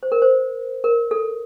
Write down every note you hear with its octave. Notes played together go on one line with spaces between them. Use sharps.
C5
A#4
C5
A#4
A4